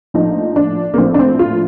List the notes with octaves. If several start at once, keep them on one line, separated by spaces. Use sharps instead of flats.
A#1 A2 F3 D#4
D4
A#3
A#1 A2 F3 C4
D4
C4
F4